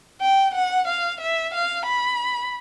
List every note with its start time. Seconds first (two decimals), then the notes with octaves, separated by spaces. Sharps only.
0.21 G5
0.54 F#5
0.88 F5
1.21 E5
1.54 F5
1.86 B5